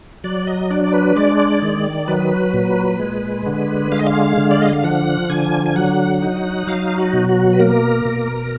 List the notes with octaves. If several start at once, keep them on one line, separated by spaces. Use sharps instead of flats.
F#3 D5
D#5
D4 D5
D5
B4
G#3 D5
D#3
F#3 B4
A#2
G#3
D3
G#3 F5
D#5
F5
D3
D5
D#5
F5
F3 F#5
D3 G#5
G#5
F#3 F#5
D#4
F#3 F5
F#4
B2
F#4
B4
A#3 A#4
B2